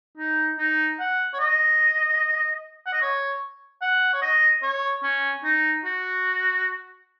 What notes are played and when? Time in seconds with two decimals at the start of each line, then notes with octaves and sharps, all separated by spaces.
0.17 D#4
0.58 D#4
0.99 F#5
1.33 C#5
1.39 D#5
2.86 F#5
2.93 D#5
3.02 C#5
3.81 F#5
4.13 C#5
4.22 D#5
4.62 C#5
5.03 C#4
5.43 D#4
5.85 F#4